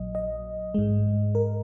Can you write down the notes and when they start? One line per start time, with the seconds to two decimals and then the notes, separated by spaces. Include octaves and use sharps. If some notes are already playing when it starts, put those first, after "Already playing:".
Already playing: A#1 A#2 F#3 D#5
0.15 D#5
0.74 G#2 G#3
1.35 A#4